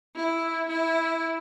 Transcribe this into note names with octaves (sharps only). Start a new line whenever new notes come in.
E4
E4